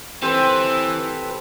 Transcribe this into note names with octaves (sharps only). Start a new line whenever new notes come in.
E3 C4 G4 A4 B4